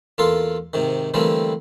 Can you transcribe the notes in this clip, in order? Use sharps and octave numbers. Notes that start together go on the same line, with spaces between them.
E2 A#3 F4 A4 C6
G#2 C3 D#3
D3 E3 G3 A3 A#3 C4